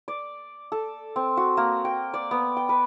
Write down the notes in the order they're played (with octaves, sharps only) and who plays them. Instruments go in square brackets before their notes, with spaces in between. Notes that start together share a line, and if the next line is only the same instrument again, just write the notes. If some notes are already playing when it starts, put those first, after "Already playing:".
[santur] D5
A4
C4
F#4
A#3
G5
D5
B3
G5
B4